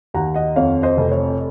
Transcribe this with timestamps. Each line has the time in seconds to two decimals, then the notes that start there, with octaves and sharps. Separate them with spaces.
0.14 D#2 F#5 A#5
0.34 D#5 F#5
0.56 F2 C#5 F5
0.83 C5 D#5
0.97 F1
1.12 C#5